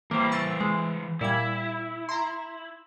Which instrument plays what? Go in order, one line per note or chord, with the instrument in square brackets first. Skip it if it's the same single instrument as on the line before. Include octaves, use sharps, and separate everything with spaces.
[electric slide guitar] E3 C5 [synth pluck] G3 A#3
[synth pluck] C#6 E6 A6
G#3
[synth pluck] A#2 G3 G#6 [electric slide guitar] E4
[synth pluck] A#5 C6